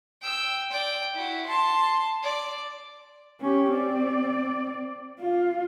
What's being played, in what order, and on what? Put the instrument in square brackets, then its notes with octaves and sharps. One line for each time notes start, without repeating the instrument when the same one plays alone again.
[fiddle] G5 E6
D5 G5
E4 F#4
A5 C6
D5
[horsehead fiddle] C#4 G4
C4 D5
F4